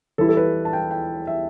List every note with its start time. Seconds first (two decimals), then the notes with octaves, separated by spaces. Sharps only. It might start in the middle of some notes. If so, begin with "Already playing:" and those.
0.18 E3 G3 E4 A4
0.29 A4
0.37 B4
0.65 A5
0.73 G5
0.91 G5
1.27 E5